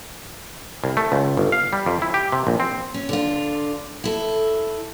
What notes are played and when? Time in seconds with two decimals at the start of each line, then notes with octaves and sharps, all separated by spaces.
0.84 C2
0.97 A3
1.12 C#2
1.37 G1
1.52 F5
1.73 G3
1.86 F2
2.02 E4
2.14 G4
2.32 C3
2.47 A#1
2.60 C4
2.94 C#4
3.09 D3 F4
4.04 E4 A4